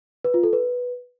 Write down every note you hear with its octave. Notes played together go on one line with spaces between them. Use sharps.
B4
F4
A4
B4